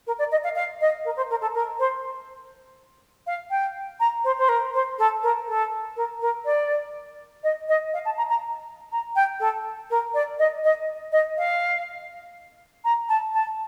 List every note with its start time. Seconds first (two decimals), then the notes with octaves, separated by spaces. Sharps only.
0.07 A#4
0.19 D5
0.32 D#5
0.44 F5
0.56 F5
0.81 D#5
1.05 A#4
1.17 C5
1.30 A#4
1.41 A4
1.55 A#4
1.79 C5
3.27 F5
3.51 G5
4.00 A#5
4.24 C5
4.38 C5
4.49 A#4
4.74 C5
4.99 A4
5.23 A#4
5.48 A4
5.97 A#4
6.21 A#4
6.45 D5
7.44 D#5
7.69 D#5
7.94 F5
8.05 A5
8.17 A#5
8.29 A#5
8.92 A#5
9.16 G5
9.40 A4
9.90 A#4
10.14 D5
10.39 D#5
10.64 D#5
11.12 D#5
11.38 F5
12.84 A#5
13.09 A5
13.34 A5